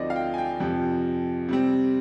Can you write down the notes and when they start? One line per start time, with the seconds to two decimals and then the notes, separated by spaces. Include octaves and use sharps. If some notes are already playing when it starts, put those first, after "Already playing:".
Already playing: D2 D3 F3 C4 D#4 D5 D#5
0.10 F5
0.16 G5
0.34 G#5
0.38 G5
0.60 F2 C3 F3
1.49 C3 G3 C4